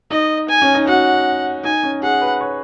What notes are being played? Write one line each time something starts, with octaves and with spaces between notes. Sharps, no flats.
D#4 D#5
G#5
C#4
D#4
F#4 F#5
D#4 G#5
C#4
G#4 F#5
B4
C#5